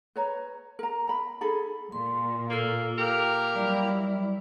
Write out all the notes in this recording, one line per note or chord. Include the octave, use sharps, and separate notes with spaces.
B4 C#5 A#5
A#4 A#5
A#5 B5
D#4 G#4 A4 B5
A#2 C6
A#3 F4 A4 E6
A#3 G4 A#4
F#3 G3 E4 D5